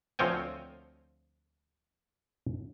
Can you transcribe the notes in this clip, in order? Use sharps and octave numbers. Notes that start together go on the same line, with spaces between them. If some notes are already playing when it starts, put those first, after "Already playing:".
D2 F3 C4 C#5 G5 G#5